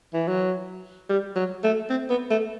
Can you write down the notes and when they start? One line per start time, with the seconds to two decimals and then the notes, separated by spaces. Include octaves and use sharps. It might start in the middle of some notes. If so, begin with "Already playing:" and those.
0.14 E3
0.28 F#3
1.09 G3
1.36 F#3
1.64 A3
1.90 C4
2.10 B3
2.30 A3